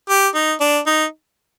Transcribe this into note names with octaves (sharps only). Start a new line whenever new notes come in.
G4
D#4
D4
D#4